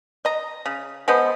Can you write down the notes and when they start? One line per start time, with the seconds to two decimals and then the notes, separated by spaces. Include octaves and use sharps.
0.25 D#5 A#5
0.66 C#3
1.08 G#3 B3 A4 C5